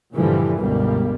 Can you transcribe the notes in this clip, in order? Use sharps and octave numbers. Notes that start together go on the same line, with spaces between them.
G2 A#2 D3 E3 F3 G3
G1 C#2 B2 G3 A#3